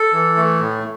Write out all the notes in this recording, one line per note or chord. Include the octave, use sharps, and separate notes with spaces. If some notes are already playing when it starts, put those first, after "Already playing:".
Already playing: A4
E3
A3
A2